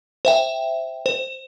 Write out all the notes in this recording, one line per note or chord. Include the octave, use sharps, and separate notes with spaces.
C5 E5 G5
C5